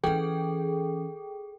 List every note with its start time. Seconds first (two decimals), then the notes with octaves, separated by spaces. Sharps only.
0.04 E3 C#4 G#4 A4 G5